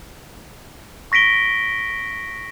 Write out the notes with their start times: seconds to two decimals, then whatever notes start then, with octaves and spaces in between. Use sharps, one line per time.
1.12 C#6 A#6 B6 D7 G7